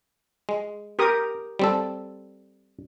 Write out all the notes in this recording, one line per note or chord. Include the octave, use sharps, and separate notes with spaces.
G#3
G4 A#4 D#6
G3 C4 A4